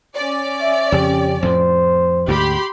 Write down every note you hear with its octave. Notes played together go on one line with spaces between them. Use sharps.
C#4 D5
E5
F2 C#3 G4
F2 A2 F3 C5
D2 G#2 G4 B5 C6